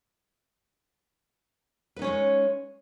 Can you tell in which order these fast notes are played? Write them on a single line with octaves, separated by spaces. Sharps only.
B4 D#4 C#4 C#5 G#3